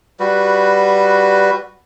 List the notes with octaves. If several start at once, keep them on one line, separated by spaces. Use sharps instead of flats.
G3 F#4 B4